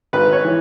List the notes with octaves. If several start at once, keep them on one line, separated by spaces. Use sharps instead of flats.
G#1 B4
C#5
E3